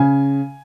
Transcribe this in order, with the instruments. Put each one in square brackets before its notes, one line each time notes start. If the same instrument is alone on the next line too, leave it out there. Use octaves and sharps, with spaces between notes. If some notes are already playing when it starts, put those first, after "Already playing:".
Already playing: [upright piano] C#3 G#5